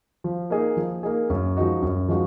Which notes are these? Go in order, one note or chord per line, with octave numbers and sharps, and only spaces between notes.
F3
A#3 D#4 G#4
F3
A#3 D#4 G#4
F#2
F3 G#3 D#4 F#4
F#2
F3 G#3 D#4 F#4